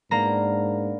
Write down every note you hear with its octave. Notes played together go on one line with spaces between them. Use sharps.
G#2 A#3 B3 D4 A#4 A#5